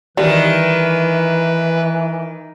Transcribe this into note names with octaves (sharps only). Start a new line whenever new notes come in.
D#3 E3 G3 B4